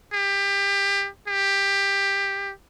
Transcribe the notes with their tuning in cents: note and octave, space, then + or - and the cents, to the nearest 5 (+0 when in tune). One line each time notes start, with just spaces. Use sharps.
G4 +25
G4 +15